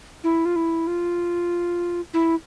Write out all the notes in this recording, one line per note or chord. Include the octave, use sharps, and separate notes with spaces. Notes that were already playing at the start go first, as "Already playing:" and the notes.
E4
F4
E4
F4
E4